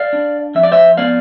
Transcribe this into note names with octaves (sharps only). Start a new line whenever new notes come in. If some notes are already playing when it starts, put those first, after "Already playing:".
Already playing: D5 F5
D4
F2 E5
D5
C5 E5
B3 D5 F5